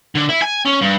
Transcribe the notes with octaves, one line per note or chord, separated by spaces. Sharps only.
D3
E4
G#5
C#4
G2